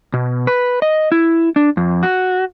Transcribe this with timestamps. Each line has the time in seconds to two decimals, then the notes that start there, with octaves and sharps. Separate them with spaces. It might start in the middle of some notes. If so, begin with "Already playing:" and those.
0.14 B2
0.47 B4
0.82 D#5
1.12 E4
1.56 D4
1.77 F2
2.03 F#4